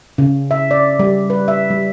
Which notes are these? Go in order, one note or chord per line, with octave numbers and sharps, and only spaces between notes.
C#3
E5
D5
G3
B4
E5
G3